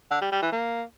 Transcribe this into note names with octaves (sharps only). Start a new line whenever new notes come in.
D3
G3
G3
E3
A#3